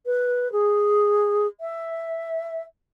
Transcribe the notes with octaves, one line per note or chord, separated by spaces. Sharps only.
B4
G#4
E5